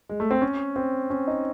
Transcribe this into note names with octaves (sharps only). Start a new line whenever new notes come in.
G#3
A3
C4
C#4
C4
C#4
D#4